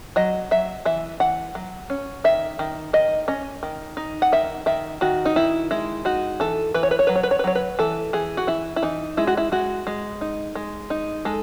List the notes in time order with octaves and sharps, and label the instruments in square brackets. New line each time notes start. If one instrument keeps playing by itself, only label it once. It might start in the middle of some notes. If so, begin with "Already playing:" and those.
[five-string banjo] F#3 D#5
F#3 E5
E3 E5
E3 F#5
F#3
C#4
D#3 E5
D#3
D#3 D#5
C#4 D#5
D#3
D#4
F#5
D#3 E5
D#3 E5
D#3 F#4
D#4
D#3 E4
G#3 E4
D#4 F#4
E3 A4
E3 B4
C#5
B4
C#5
F#3 B4
C#5
B4
C#5
B4
F#3 C#5
B4
E3 A4
E3 G#4
F#4
E3 E4
E4
E3 D#4
G#3 E4
F#4
E4
G#3 F#4
G#3
D#4
G#3
D#4
G#3 A4